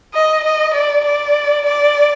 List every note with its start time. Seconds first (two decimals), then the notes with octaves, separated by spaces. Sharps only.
0.14 D#5
0.44 D#5
0.74 D5
1.05 D5
1.66 D5